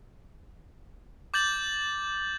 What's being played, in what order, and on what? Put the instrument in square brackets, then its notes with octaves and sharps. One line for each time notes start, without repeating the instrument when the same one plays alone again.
[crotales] D6 G6 A6 F#7